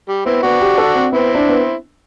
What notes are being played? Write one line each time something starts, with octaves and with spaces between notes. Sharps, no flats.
G3
B3 C4 E4
B3 D4 F#4
G4
A4
C4
B3 C4 E4
D4
B3